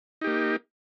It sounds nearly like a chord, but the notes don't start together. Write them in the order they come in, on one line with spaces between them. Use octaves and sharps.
D#4 G4 A#3